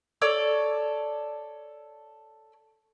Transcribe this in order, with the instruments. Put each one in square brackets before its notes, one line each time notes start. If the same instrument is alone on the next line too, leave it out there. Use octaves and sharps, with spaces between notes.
[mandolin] A4 C#5 D5 E6